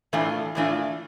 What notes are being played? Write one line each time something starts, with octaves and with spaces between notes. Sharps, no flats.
A2 E3 A3 D4 F4
A2 E3 A3 D4 F4